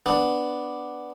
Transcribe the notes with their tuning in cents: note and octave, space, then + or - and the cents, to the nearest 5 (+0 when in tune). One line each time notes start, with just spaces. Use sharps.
B3 +0 D4 +0